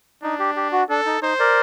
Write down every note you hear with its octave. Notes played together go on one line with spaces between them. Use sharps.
D4 D#4
G4
G4
F#4
D4 A4
D#4
D#4 C5
A#4 D5